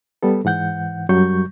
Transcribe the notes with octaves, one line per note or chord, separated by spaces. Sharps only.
G3 B3 A4
G#2 E3 F#5 G6
F#2 F#3 G3 C#6 G6